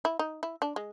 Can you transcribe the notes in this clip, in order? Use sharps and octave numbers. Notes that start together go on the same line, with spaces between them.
E4
D#4
E4
D4
G#3